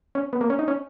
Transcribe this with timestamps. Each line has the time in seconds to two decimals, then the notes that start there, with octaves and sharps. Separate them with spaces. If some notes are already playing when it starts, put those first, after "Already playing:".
0.15 C#4
0.33 B3
0.41 A#3
0.50 C#4
0.59 D#4
0.68 C#4